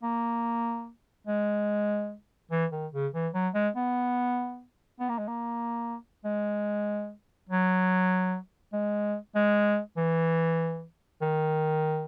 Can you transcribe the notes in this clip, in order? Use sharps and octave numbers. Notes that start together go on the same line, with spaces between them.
A#3
G#3
E3
D#3
C#3
E3
F#3
G#3
B3
B3
A#3
G#3
A#3
G#3
F#3
G#3
G#3
E3
D#3